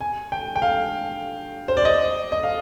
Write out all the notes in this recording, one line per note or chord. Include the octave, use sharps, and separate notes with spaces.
G#5
G5
G5
F5
C5
D5
D#5
D#5
F5